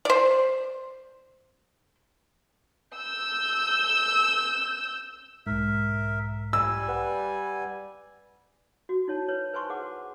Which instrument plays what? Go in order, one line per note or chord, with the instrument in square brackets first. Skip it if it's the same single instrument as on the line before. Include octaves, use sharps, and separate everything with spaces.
[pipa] C5 D5
[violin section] E6 G6
[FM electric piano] B1 G#2 [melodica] A#4 E5
[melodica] G3 G#5 [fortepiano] E6
[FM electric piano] B4 F#5
[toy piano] F#4
D#4 E4 C#5 A5
B4 C#5
B4 C5 G#5 A5 C6 C#6
G#4 B4 F#5 D6